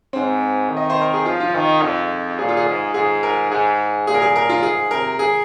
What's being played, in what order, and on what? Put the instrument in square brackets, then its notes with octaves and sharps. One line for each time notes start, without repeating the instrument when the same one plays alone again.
[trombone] G#2 [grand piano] C4
[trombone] D#3
[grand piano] D#5
C5
A#4
G#4
[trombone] F3 [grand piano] F4
[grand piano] F4
[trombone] D#3 [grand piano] D#4
[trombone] F2
[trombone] A#2 [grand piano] G#4
[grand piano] F4
G#4
[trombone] G#2
[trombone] G#2 [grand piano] G#4
[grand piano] A#4
[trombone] G#2 [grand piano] G#4
[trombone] A#2 [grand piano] G#4
[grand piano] A#4
G#4
A#4
F4
[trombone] G#2 [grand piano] G#4
[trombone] C3 [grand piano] A#4
[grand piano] G#4